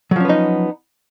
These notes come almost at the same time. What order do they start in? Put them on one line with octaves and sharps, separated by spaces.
F#3 F3 C#4 B3 D#4